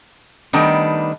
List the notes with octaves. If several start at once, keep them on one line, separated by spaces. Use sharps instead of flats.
D#3 G3 A3 B3 D4 D#4